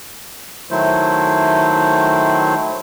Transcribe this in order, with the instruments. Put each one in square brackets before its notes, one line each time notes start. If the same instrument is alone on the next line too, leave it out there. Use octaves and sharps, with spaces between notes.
[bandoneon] D#3 F#3 A3 E4 C5